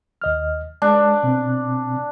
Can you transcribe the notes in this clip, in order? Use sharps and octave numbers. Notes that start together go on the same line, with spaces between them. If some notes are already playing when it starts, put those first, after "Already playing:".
D#2 D#5 F6
G#3 D4
B2 C4